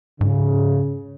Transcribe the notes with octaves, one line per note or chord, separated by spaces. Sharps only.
G#2 C#3